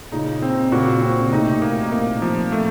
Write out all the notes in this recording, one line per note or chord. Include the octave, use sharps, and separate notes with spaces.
A#2 C#3 D#4
C4
A#2 C#3 F#4
C4
C#3
A2 C3 D#4
A#3
A#2 A#3
F3
A3